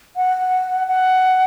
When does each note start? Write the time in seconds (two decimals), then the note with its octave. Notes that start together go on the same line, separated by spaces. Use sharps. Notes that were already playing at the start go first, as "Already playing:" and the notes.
0.17 F#5
0.88 F#5